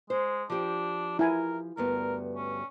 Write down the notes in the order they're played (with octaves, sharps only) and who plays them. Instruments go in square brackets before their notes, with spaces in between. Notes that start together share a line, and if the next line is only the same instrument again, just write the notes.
[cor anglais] G#3 [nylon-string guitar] C5
[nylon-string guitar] F3 G4 [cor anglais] D4
[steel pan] E4 G#5 [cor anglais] A#4
[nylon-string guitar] D2 G2 B3 [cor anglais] A#4
[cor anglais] C#4